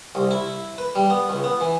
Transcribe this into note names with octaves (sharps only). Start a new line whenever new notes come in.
C2
E4
B4
G3
B3
C#2
B3
E3